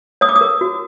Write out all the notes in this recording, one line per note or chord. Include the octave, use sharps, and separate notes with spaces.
C#5 D#6
D6
D#6
A#4
F#4